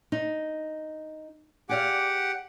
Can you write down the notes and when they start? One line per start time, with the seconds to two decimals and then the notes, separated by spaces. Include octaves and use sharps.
0.12 D#4
1.69 G4 G#4 D5 F5 F#5 D6